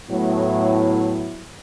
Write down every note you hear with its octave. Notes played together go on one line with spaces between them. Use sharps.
A2 F#3 B3 E4